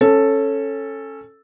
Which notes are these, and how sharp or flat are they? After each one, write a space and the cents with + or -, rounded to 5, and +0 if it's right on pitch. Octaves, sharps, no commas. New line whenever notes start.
C#4 -15 A4 +0